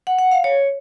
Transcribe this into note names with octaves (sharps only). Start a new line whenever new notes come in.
F#5
F#5
F5
C#5